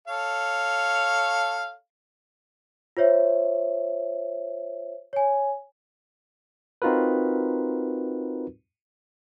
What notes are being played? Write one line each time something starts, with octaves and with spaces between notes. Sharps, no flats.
A4 C#5 F5
F4 C5 C#5 E5
C#5 G#5
C4 D#4 F4 F#4 A#4 B4